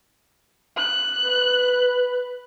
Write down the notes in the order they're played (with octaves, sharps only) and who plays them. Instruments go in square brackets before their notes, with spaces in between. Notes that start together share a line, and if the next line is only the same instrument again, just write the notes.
[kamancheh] F#6
[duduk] B4